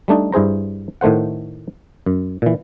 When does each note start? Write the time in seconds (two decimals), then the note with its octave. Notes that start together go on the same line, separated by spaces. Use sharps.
0.08 G3 A3 D4 D#4
0.32 G2 E4 G#4 C5 A#5
1.01 A2 D#3 A3 C5 F#5
2.06 F#2
2.42 A#2 E3